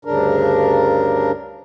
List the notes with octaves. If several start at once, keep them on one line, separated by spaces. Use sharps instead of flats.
D2 G2 C#3 D4 A#4